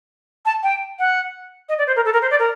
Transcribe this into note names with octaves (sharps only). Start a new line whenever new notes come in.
A5
G5
F#5
D#5
D5
C5
A#4
A4
A#4
C5
D5
A#4